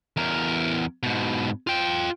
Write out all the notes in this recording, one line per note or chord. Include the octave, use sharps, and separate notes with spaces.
E2 A#4
G#2 B2
F4 G5